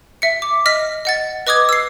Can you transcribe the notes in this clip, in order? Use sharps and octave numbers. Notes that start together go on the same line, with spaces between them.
E5 C#7
D6
D#5 F6 B6
D#5 F#5 A6
B4 D#5 D6 D#6 G#6
E6 C7